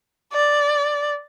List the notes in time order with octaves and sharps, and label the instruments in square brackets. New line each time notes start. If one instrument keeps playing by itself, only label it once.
[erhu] D5